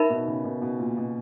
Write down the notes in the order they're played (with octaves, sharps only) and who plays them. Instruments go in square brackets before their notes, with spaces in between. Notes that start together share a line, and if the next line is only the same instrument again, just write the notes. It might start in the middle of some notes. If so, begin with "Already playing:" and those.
Already playing: [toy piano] D#4 A#4 E5 B5
[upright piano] B2
C#3
B2
B2
A#2
B2